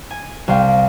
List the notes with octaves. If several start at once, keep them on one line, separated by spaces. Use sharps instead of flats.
G#5
C2 C4 F5 G5